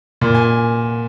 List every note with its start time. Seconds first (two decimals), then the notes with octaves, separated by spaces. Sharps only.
0.21 A#2
0.35 G#5